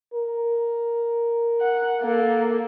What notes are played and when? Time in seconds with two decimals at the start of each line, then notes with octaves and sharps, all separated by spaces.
0.14 A#4
1.61 F#5
2.01 A#3 A4